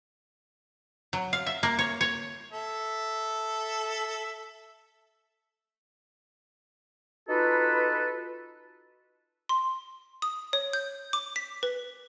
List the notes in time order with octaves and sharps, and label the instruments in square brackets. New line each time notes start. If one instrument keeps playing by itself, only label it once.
[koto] F#3
F5
E5
A#3
C#5
C#5
[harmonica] A4 E5
[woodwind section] D#4 F4 F#4 A4 B4
[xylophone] C6
D#6
C#5
G6
D6
B6
B4